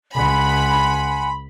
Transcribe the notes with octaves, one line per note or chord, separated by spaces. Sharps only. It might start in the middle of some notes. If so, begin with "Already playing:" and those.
C#2 F#5 G#5 B5 C6